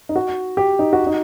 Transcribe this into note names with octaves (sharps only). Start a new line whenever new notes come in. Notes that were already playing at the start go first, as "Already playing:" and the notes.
D#4
F#4
G4
D#4
F#4
D#4